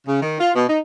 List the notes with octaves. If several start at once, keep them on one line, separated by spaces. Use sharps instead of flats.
C#3
D#3
F4
B2
D#4